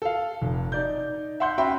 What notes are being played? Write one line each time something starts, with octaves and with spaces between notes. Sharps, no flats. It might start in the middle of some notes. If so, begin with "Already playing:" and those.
A4 F5
F1
D#4 D5 G6
E5 F#5 C6 G6
C#4 F#4 E5 G5 B5 C6